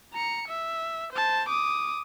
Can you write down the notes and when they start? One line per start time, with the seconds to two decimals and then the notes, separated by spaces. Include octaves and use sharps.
0.13 A#5 C#7
0.48 E5
1.13 C5 A5
1.49 D6 D#6